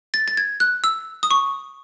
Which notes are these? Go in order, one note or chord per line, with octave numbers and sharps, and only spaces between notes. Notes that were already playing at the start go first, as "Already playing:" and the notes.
A6
A6
G#6
F#6
E6
D#6
C#6